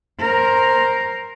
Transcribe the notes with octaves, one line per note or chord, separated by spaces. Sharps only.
A#4 C5